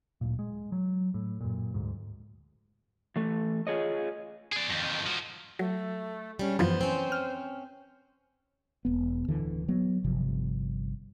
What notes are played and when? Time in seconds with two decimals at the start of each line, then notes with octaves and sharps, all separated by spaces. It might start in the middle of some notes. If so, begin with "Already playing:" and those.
0.21 D1 A#2
0.39 G#3
0.72 F#3
1.14 A2
1.41 F#2 A#2
1.74 D2 G#2
3.16 E3 A3
3.67 F4 G#4 C#5 D#5
4.52 G#4 D5
4.70 F2 D#3
5.07 F3 F#4
5.59 F#3 A3
6.39 G3 G#3 C#4 D4
6.59 F#2 E3 F3 B3 C5
6.81 C4 C#4
7.12 F6
8.85 E1 B3
9.28 D1 D3 E3
9.68 F#3 B3
10.04 G1 C3 F3